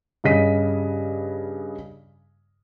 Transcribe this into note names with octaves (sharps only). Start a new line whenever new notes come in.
G2 C#3 D#5 B6 D#7